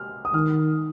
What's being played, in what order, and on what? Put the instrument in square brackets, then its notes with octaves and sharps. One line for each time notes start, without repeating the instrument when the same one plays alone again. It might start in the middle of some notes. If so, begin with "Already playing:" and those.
Already playing: [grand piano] F6
D#6
[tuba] D#3 [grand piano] F6